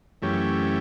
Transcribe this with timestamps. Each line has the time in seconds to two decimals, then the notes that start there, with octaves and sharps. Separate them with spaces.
0.22 F#2 E3 A3 C#4 G4